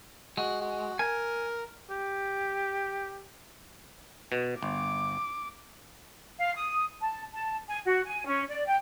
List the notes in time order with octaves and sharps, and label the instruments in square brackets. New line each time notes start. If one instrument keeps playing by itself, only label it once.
[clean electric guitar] G#3 [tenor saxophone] F#4
[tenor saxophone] F#4
[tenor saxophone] A#4 [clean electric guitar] G#5
[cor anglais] G4
[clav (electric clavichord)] B2
[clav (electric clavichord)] G1 [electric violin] D6
[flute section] F5
D#6
A5
A5
G#5
F#4
G#5
C#4
D5
G5